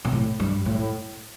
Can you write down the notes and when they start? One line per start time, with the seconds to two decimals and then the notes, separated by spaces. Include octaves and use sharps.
0.05 A#2
0.12 A2
0.40 G2
0.66 A2